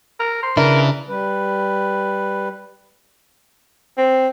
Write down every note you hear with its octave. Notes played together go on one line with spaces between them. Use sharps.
A#4
C5
C#3 E3 D4 E4 A#4
G3 B4
C4